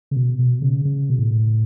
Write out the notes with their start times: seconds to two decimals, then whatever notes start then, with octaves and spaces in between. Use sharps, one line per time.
0.11 C#3
0.16 B2
0.39 B2
0.62 C#3
0.85 C#3
1.10 B2
1.19 A2